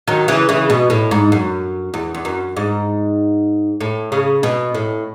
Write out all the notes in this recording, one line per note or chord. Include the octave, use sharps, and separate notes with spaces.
D#3 F#3
C#3 E3
C#3 E3
B2
A2
G#2
F#2
E2
E2
F#2
G#2
A2
C#3
B2
A2